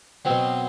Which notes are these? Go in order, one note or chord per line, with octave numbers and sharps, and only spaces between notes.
B2 F#3 C4